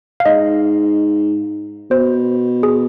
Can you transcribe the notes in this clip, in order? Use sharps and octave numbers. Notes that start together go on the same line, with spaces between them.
F5
G#2 D#5
B2 C5
G#4